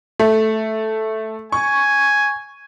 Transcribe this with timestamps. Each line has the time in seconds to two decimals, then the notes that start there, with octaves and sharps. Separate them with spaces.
0.19 A3
1.52 G#5 C#6